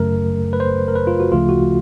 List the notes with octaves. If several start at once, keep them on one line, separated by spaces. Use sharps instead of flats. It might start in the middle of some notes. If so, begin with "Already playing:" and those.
Already playing: F#2 C#3 F#3 A3 A#4
B4
C5
A#4
B4
F4
F#4
D2 C#3 F3 A3 F4
F#4